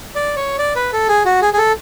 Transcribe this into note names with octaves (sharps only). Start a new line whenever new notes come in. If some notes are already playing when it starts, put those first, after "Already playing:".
D5
C#5
D5
B4
A4
G#4
F#4
G#4
G#4
A4